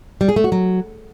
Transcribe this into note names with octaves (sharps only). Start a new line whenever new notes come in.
G3
G#4
A3
F#4
F#3